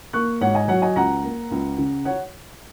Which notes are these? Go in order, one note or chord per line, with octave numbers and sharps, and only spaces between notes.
A#3 C#6 F#6
G#2 C#5 F#5
D#5 G#5
F#3 C#5 F#5
D#5 G#5
C#2 F#5 A#5
A#3
C#2
C#3
C#5 F#5